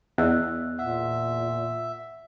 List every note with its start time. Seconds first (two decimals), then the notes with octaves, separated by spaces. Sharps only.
0.18 E2 D#5 E6 F#6
0.79 A#2 E5 F#5 E6